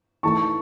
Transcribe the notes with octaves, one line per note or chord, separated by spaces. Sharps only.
E3 A3 D#4 A5 C#6